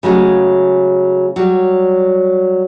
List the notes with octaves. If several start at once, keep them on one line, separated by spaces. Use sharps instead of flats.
C#3 F#3 G#3 A3
F#3 G3